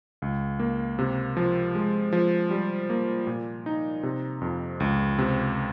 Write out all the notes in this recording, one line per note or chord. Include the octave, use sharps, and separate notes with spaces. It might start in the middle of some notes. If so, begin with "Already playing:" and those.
C#2
A#3
C3
F3
G#3
F3
G3
A#3
A#2
D#4
C3
F2
C#2
C3